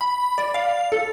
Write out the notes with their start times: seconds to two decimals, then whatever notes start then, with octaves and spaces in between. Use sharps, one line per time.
0.01 B5
0.38 D5
0.54 F5
0.92 A4